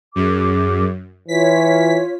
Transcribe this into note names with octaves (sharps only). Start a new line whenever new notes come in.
F#2 G#4 D6
E3 F4 C#5 B6